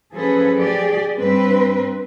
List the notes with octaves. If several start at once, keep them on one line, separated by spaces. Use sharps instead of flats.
F3 F#3 C#4 G#4 A4 B4
G4 G#4 D5
G2 C4 B4